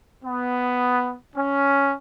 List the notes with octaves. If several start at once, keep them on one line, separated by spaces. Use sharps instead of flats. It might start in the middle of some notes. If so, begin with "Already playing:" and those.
B3
C#4